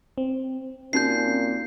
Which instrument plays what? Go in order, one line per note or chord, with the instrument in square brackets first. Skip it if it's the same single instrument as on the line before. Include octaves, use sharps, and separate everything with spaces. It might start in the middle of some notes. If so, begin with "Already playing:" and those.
[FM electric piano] C4
[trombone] A#2 [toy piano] C#4 D#4 F#4 [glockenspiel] G6 C7